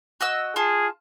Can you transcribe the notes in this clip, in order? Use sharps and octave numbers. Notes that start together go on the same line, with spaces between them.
F#4 D#5 E6
F4 G#4 A5